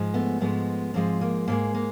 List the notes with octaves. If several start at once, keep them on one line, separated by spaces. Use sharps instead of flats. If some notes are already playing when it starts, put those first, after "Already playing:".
Already playing: G#2 F3 G#3
A3 B3
G#2 F3 G#3 A3 B3
G#2 F3 G#3 A#3 C4
A#3
G#2 F3 G#3 A#3
A#3